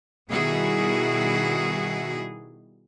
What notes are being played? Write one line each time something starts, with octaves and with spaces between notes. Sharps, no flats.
B2 D#3 G3 E4 F#4 G#4